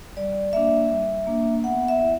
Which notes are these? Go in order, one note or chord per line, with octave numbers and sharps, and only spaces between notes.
G3 D5
A#3 D4 E5
G3
A#3 D4
B3 F#5
E5
E4